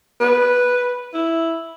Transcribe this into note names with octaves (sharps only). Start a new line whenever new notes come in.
B4
E4